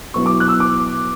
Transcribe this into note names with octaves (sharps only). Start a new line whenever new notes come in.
B2 F#3 B3 E4 C#6
D6
F#6
E6
D6